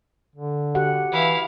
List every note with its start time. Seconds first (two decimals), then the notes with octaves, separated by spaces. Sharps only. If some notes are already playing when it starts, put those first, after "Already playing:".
0.36 D3
0.75 F#4 G4 F#5
1.12 E3 E4 F5